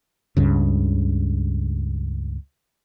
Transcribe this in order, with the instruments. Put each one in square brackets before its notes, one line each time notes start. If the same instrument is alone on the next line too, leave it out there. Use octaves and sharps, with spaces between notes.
[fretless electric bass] C#2 G2 C#3